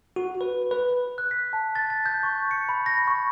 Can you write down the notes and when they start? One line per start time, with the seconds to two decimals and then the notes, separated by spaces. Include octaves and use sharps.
0.16 F#4
0.41 B4
0.71 B4
1.18 F#6
1.31 B6
1.53 A5
1.75 A6
1.90 A6
2.06 G6
2.23 C#6
2.51 C#7
2.69 B5
2.86 A#6
3.08 C#6